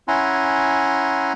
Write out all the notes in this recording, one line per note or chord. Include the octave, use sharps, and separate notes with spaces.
C#4 E4 F#5 G#5 A#5 C6